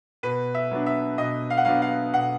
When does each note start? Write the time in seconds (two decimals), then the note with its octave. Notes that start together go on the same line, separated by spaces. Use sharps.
0.23 B2 B4
0.54 E5
0.71 F#3 B3 D4
0.86 E5
1.18 B2 D#5
1.50 F5
1.57 F#5
1.65 F#3 B3 D4 F5
1.82 F5
2.13 B2 F#5